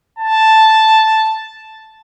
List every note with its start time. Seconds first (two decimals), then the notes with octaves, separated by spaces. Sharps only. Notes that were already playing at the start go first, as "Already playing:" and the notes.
0.19 A5